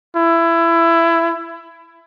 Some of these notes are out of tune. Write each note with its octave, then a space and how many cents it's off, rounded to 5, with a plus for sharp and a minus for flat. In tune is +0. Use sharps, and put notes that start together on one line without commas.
E4 +20